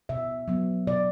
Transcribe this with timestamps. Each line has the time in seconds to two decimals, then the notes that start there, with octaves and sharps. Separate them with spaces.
0.09 B2 E5
0.48 F#3 B3
0.87 B2 D5